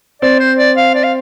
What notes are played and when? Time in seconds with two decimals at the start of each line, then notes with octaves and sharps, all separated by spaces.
0.22 C4 D5
0.40 C5
0.59 D5
0.77 F5
0.95 D5
1.04 F5